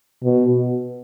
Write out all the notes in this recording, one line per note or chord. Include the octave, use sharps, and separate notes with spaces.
B2